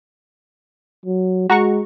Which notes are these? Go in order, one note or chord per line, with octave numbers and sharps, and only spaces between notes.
F#3
G#3 F#4 A#5 C#6